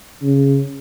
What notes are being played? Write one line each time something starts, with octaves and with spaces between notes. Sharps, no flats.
C#3